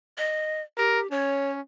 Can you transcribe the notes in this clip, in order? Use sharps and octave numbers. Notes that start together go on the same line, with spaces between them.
D#5
G4 A#4
C#4 C#5